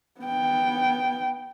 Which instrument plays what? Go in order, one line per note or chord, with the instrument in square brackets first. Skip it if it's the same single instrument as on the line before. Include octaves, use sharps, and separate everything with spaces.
[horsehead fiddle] B3 G5